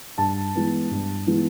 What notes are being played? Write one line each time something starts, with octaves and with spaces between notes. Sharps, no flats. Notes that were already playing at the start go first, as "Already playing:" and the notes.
G2 A5
E3 G#3 B3
G2
E3 G#3 B3